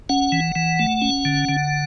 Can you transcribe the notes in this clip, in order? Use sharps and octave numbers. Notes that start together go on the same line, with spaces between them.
C#4 F#5
E3
E3
A3
C#4
D3
D3